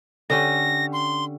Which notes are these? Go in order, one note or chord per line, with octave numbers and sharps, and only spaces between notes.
D3 C#4 G4 A#6
C6